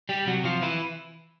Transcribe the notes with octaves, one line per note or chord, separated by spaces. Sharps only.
G3 G4
C3 F#3 F#4
F3 F4
E3 E4